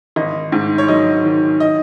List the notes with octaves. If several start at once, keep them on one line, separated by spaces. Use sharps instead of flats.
G#1 D#5
G#2
C#5
F#3 D#5
D#3
D#5